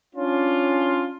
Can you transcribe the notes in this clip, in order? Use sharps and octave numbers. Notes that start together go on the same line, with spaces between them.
C#4 D4 F4